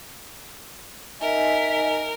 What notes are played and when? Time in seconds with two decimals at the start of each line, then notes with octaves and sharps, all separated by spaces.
1.21 D#4 A#4 D#5 E5 G#5